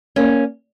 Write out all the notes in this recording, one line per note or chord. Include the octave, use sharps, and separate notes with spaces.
A#3 C#4